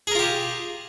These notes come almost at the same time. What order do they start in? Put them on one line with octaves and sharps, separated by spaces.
G#4 A#4 F4 G4